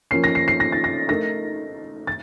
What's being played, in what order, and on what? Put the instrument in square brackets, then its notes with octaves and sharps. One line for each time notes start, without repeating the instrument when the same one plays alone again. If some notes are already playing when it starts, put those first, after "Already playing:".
[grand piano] F3 A#3 C#4 [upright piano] C7
[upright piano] A#6
C7
C7
A#6
A6
A#6
[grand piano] A3 D#4 A#4 [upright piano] A#6
[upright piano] A6